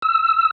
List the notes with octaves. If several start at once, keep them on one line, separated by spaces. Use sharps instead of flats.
E6